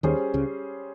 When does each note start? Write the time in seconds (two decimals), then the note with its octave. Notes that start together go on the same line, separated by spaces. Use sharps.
0.03 D#2 D#3 G3 C#4 G#4 C5
0.34 C#2 C#3